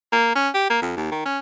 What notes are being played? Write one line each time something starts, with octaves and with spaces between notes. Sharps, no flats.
A#3
C#4
G4
A#3
F2
D#2
D#3
C#4